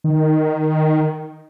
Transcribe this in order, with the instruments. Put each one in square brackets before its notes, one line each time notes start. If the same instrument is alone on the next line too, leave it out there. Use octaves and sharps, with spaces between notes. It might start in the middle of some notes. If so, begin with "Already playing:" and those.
[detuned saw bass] D#3